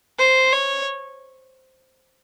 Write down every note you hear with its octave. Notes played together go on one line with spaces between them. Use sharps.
C5
C#5